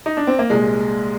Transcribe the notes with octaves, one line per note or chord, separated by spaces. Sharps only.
D#4
D4
C4
A#3
C2 A#2 G#3